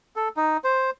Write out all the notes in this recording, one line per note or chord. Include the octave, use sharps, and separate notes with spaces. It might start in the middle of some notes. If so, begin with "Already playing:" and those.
A4
D#4
C5